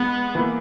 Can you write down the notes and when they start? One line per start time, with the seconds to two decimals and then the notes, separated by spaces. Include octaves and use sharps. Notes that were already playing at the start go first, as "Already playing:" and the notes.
Already playing: G#3 B3
0.35 E3 A#3 E4